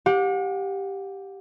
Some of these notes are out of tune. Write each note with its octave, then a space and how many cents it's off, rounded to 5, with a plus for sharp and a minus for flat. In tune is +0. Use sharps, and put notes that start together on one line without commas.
G4 +0 F#5 -40